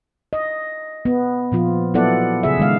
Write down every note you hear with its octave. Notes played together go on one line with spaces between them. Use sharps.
D#5
B3
A#2 F3 F4
F#3 B3 E4 A4 D5 F#5
C#3 G#4 E5
D#3 G#3 F5